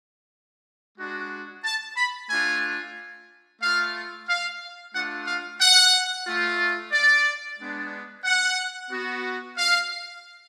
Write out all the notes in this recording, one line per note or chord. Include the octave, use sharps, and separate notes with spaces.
G#3 D4 F#4
A5
B5
A3 D4 F4 G#5
A3 F4 F5
F5
A3 D4 F4 F#5
F5
F#5
A3 F4
D5
G#3 B3 D4
F#5
B3 F#4
F5